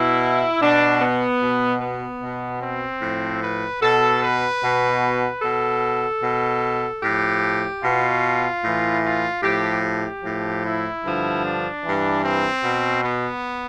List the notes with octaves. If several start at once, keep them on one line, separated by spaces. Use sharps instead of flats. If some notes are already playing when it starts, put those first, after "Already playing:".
Already playing: B2 E4
B2 D4
B3
B2
B3
B2
C4
A2 F3
B4
B2 A4
B4
B2
B2 A4
B2
A2 F3 G4
B2 F4
A2 E3
F4
A2 F3 G4
G4
A2 F3
E4
G2 D3 F3
D4
G2 E3
C4
B2
B3